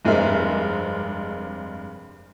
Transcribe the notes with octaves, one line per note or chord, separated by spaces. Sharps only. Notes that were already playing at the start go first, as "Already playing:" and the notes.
F1 G2 G#3 C4 A#4 E5